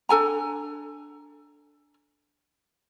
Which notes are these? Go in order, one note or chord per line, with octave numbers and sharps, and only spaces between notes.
D4 A4 G#5 A#5